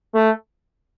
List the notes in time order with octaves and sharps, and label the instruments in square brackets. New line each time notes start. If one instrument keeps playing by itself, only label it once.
[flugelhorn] A3